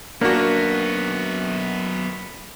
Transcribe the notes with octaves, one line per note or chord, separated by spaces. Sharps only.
F#2 A#3 B3 D4 F#4